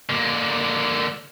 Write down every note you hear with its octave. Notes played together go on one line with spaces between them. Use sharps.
D3 A#3